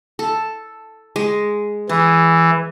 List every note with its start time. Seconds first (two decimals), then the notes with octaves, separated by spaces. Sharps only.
0.19 A4
1.16 G#3
1.89 E3 G#4